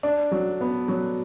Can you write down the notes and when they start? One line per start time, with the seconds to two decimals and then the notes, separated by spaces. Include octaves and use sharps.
0.03 D4
0.31 F#3
0.61 B3
0.88 F#3